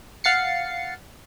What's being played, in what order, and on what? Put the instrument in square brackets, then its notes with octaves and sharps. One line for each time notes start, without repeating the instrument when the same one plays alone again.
[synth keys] F5 F#5 A6 C7 C#7